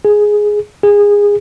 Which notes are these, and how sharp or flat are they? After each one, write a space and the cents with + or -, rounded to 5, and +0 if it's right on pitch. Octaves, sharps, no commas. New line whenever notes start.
G#4 +5
G#4 -20